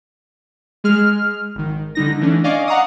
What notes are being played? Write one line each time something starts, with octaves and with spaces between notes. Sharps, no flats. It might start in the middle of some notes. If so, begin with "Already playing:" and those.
G#3 G#4 F6
G#1 D#3
D3 G3 D#4 A#6
D3 E3 A3 C#4 D4
D5 D#5 F5 G#5 C#6 D6
F5 F#5 A#5 C#6 D#6